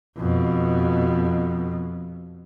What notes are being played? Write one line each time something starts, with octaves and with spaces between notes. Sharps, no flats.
F2 B2